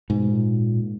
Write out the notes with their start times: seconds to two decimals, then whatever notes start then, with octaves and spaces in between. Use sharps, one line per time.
0.09 G#2 B2
0.30 A#2